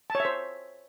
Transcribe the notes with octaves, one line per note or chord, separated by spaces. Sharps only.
A5
C#5
E5
C5